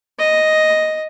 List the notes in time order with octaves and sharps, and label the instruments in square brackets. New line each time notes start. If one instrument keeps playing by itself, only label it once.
[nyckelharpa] D#5